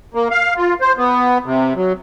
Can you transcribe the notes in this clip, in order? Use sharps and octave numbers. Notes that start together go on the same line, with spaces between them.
A#3
F5
F4
C5
B3
C3
F#3